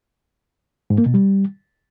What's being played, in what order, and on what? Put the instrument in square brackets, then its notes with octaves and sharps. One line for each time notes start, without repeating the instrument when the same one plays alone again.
[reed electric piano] G#2
A#3
B2
G3